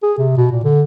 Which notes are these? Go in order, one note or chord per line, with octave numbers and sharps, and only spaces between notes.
G#4
C3
B2
A#2
D3